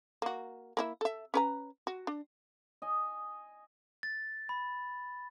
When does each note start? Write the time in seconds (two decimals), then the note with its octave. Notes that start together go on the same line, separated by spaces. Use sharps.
0.22 A#3 F#4
0.77 A#3 E4 E5
1.01 A4 E5
1.34 C#4 B4 A#5
1.87 F#4
2.07 D4
2.82 D#5 G#5
4.03 A6
4.49 B5